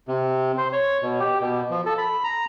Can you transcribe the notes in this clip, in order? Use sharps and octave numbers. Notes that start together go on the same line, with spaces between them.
C3
C5
C#5
B2
G4
B2
F3
A4
B5
A#5